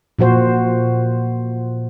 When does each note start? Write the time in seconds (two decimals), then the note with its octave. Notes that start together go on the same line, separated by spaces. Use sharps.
0.19 A#2 F3 F#4 C5